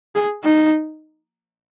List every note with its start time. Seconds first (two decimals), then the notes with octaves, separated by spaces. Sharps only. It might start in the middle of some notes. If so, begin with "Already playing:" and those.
0.15 G#4
0.43 D#4